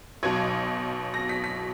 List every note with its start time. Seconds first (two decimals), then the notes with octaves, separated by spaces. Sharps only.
0.23 B1 B2 F#3 G#6
1.14 A#6
1.29 B6
1.44 B6